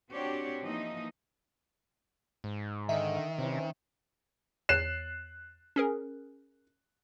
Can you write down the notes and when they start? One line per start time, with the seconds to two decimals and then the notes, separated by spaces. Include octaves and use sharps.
0.11 C4 D4 F#4 G4 C#5 D5
0.62 E3 F3 A#3 D#4 D#5
2.44 G#2
2.89 D3 D#3 D#5 E5
3.39 C3 E3 C4 C#4
4.69 E2 C#5 F#6 C7 E7
5.76 C#4 G#4 A#4